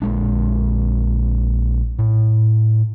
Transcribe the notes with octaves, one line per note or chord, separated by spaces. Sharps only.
A#1 G#3 D4
A2